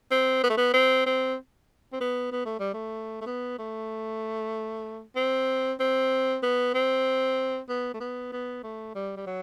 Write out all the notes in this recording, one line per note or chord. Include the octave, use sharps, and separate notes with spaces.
C4
B3
A3
B3
C4
C4
C4
B3
B3
A3
G3
A3
A3
B3
A3
C4
C4
B3
C4
B3
A3
B3
B3
A3
G3
G3
F#3